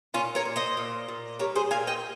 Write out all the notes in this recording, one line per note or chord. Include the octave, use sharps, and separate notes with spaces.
A#2 C#4 F4
A#4 C#5
A#2
C5 D#5
A#2
A#2
G3 A#4 C#5
G#4 C5
A#2 F5 G#5
D#5 G5